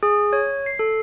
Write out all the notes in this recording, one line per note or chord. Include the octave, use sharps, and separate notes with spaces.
G#4
C#5
C7
A4